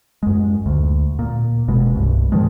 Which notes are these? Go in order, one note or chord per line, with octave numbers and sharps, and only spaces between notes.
F#2 G#3
D2
A#2
F1 B2 G#3
C2 G2
G#2 D#3 F3 G#3